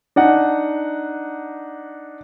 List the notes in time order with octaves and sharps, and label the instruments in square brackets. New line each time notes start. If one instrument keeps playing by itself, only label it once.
[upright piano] D4 D#4 F#5